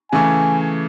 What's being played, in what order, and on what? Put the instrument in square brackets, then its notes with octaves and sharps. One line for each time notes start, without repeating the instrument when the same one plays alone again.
[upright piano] C#3 E3 A3 [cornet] G#5